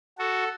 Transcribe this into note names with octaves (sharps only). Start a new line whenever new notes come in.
F#4 A4